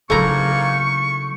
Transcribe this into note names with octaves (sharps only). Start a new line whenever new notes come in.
G#2 C#3 F#3 A3 A#3 E4 A#5 C#6